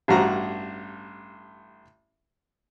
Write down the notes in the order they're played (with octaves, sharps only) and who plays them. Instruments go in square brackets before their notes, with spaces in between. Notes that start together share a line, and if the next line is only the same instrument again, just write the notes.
[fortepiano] A1 G2 F#4 A#5